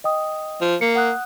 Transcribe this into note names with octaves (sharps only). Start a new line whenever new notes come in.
D#5 G5 D#6
F3
A#3 C#7
F#5 D#6 F#6